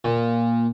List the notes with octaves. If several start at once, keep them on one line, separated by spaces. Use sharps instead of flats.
A#2